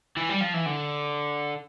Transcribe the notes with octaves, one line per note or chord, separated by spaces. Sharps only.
E3
G3
F3
E3
D3